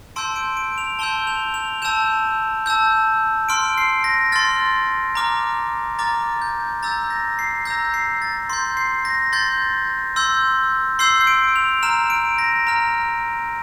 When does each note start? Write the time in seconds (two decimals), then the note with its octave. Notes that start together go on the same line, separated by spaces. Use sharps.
0.16 A5 C6 E6 G6 D7
0.36 D7
0.57 D7
0.78 F7
0.99 A5 C6 E6 G6 G7
1.27 F7
1.54 F7
1.82 A5 E6 G6 E7
2.66 A5 E6 G6
3.49 C6 F6 D7
3.78 C7
4.04 A#6
4.32 C6 F6 A6
5.15 A#5 D6 F6
5.99 A#5 D6 F6 A6
6.42 G6
6.83 A#5 E6 G6 A6
7.10 A#6
7.39 C7
7.65 A#5 E6 G6 A#6
7.94 C7
8.22 A6
8.50 C6 G6
8.77 C7
9.05 A#6
9.33 C6 G6 A6
10.16 C6 E6 G6
10.99 C6 E6 G6 C7
11.21 C7
11.27 D7
11.56 F7
11.83 A#5 F6 E7
12.10 D7
12.38 A#6
12.67 A#5 F6